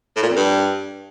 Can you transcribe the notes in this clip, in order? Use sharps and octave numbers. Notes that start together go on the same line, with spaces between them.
A2
A#2
F2
G2